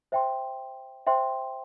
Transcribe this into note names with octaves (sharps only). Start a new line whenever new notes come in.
C5 E5 G5 C6
C5 E5 G5 C6